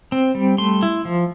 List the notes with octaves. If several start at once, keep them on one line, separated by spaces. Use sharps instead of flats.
C4
G3
A3 C6
E4
F3